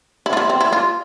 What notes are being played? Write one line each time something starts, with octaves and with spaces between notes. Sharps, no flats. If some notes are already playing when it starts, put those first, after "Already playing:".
E4
F4
E4
C4
E4
F4